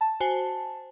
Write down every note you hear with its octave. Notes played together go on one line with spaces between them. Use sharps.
A5
F#4 C5 G#5